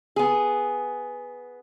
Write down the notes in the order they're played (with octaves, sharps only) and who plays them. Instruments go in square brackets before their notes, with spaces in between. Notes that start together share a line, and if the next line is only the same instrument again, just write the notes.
[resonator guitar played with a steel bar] B3 G#4